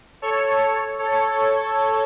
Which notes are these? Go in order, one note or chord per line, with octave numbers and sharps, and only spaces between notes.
A4 C#5
A4 C#5